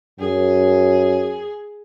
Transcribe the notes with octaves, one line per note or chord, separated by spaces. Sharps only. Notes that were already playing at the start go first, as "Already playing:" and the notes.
F#2 G#4